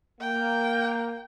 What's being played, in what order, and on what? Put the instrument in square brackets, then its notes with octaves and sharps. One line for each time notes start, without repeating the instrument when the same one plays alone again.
[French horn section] A#3 [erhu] G5